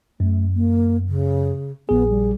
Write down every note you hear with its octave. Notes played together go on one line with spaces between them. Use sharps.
F#2 A3
A#3
C#3
A#1 B3 G#4
G3